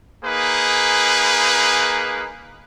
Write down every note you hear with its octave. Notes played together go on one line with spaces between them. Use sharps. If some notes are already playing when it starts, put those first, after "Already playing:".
A#3 D#4 G#4 B4